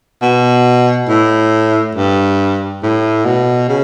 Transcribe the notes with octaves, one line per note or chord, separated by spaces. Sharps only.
B2
A2
G2
A2
B2
C#3